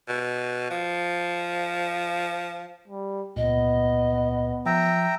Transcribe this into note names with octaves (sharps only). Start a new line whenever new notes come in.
B2
F3
G3
C#2 A#2 B3 D#5
F3 E5 G5 A#5